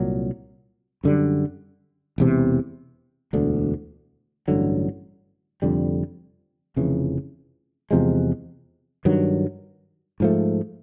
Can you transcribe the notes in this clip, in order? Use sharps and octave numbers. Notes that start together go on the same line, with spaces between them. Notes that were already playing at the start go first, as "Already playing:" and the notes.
Already playing: C2 A#2 F#3
F#2 D3 G3
E1 E2 C3
E1 D2 D3
A1 G2 D3 F#3
F1 F2 D3 G3
F1 F2 C#3 E3
E2 C3 F3 G#3
G2 D#3 F#3
G#2 F3 A3